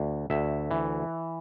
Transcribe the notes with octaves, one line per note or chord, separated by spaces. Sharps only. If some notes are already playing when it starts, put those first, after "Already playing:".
Already playing: D2
D2 E5
E3